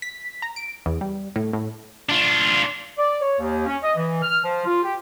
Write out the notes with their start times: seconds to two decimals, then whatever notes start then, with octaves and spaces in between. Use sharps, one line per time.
0.02 B6
0.42 A#5
0.56 D7
0.86 E2
1.01 G3
1.36 A2
1.53 A2
2.09 D4 F4
2.97 D5
3.21 C#5
3.39 D#2
3.66 C#4
3.83 D#5
3.96 E3
4.22 F6
4.43 F3
4.65 F4
4.83 G4